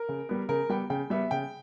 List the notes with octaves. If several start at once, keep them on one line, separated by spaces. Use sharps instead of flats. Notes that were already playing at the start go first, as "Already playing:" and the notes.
Already playing: A#4
C#3
G3 B3
C#3 A#4
G3 B3 G5
C#3 G5
G3 B3 E5
C#3 G5